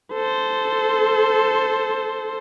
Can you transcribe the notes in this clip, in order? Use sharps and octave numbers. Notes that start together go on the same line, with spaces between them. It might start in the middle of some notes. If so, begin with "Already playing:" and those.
A4 C5